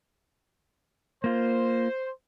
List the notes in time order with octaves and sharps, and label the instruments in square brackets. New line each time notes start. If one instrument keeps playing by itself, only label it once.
[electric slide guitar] A#3 F4 [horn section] C5